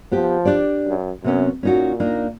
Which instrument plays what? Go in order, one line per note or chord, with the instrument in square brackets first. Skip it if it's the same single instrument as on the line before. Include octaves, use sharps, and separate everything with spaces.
[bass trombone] F3 [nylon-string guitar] B3 G4
[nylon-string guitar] D4 G4 D5
[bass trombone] F#2
[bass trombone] F#2 [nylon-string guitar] C3 B3 C#4
[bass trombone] A#2 [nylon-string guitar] C#4 D#4 F#4
[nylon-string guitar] A#3 D4 D#4